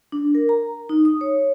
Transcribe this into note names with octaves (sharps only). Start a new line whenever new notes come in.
D4
A#4
A#5
D#4
D#6
C#5